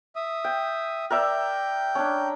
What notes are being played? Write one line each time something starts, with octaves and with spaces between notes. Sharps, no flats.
E5 D#6
G5
A#4 D5 E5 G5
C#4 D4